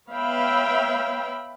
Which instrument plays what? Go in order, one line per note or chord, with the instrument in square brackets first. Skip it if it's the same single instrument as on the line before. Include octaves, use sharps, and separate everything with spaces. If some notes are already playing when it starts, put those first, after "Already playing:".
[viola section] B3 C#5 E5 F5 G5 B5